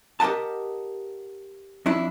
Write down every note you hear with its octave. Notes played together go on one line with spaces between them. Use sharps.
G4 A#4 D#5 F#5 A5
F2 D4 E4